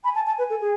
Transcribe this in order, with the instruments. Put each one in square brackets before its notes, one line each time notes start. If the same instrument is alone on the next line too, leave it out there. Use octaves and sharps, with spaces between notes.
[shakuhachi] G#5 [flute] B5
[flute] A5
A5
B4
A4
G#4